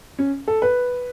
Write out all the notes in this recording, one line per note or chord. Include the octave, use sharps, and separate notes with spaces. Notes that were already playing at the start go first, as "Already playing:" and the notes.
C#4
A4
B4